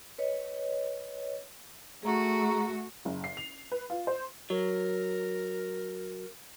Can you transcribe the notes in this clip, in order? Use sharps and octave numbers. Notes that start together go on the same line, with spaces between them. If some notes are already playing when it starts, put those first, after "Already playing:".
B4 C#5 D#5
A3 F#4 G#4 A#5 C#6
F#1
C7
F7
B4
F4
C5
F#3 A#4